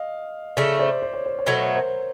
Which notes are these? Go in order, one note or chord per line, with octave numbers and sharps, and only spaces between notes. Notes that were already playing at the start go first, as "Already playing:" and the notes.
Already playing: D#5 F5
C#3 F3 A3 D5 E5
C5 D5
C5
C#5
C5
C#5
B2 F#3 A3 C5
C#5
A#4 C5